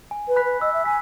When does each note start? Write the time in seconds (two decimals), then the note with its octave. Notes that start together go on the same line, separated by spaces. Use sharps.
0.11 G#5
0.28 B4
0.36 B5 F#6 B6
0.45 B4
0.61 D#5 E6
0.74 E5
0.85 G#5 B6